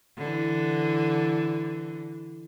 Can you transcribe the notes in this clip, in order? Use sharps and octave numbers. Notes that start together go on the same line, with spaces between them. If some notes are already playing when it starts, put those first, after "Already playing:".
D3 E3